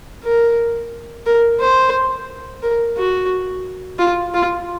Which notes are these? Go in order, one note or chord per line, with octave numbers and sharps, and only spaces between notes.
A#4
A#4
C5
A#4
F#4
F4
F4